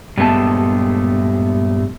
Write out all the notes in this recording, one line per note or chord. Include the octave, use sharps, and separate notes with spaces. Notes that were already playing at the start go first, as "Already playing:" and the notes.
G2 A#2 G#3 A3 B3 A5